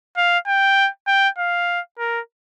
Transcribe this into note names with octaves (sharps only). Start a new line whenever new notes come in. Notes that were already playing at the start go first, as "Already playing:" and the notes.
F5
G5
G5
F5
A#4